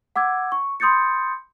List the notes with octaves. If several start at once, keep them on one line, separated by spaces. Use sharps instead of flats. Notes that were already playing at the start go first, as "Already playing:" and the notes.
F#5 D6 E6 G#6
C#6
B5 C6 D#6 G6 A6 C#7